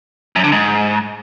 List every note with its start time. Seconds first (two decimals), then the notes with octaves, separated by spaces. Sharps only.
0.36 F#2
0.44 D3
0.52 G#2